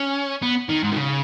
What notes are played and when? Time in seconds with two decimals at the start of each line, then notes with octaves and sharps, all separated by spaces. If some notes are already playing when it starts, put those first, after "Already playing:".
Already playing: C#4
0.42 B3
0.69 D#3
0.83 G#2
0.92 D#3
0.97 C#3